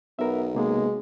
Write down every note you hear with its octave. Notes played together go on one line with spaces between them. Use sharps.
B1 B3 A#4 E5
C3 G#3 A#3 B3